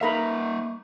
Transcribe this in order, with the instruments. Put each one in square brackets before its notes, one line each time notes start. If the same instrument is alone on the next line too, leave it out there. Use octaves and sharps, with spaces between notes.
[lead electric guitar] A#3 E5 [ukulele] D#4 A#4 B4 [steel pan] F5 A#5 B5